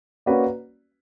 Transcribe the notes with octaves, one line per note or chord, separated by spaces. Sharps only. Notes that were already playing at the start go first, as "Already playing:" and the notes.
A#3 C#4 F#4 B4 D5